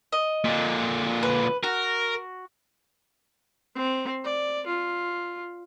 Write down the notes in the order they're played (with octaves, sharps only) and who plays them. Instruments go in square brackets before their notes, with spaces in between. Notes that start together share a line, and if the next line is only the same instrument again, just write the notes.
[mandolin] D#5
[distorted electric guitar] A#2 D3
[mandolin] B4
[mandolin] F#4 [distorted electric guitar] A#4
[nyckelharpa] C4
D5
F4